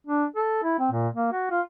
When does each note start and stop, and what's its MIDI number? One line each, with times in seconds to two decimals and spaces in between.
0.07 0.24 62
0.36 0.58 69
0.63 0.74 64
0.79 0.87 60
0.91 1.08 46
1.15 1.31 58
1.32 1.50 66
1.51 1.61 65